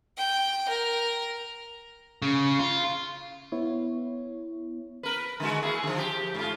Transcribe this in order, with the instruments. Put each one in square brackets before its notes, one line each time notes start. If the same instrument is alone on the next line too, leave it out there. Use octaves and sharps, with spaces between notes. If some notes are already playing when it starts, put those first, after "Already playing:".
[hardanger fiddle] G5
A#4
[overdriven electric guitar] C#3
F4
[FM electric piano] B3 E4 C#5
[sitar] A#4 B4
D3 G#3 F#4
A#3 E4 G#4
D3 F3
G4
G#2 F4